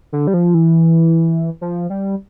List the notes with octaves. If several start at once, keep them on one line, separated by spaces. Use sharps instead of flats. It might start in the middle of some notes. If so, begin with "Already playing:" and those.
D3
G3
F3
E3
F3
G3